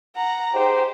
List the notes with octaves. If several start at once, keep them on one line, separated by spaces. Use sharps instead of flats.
F#5 A#5
D#4 G4 G#4 C5